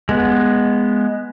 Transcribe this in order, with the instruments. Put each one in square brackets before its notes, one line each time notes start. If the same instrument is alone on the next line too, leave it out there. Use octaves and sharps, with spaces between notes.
[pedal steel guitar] G#3 B3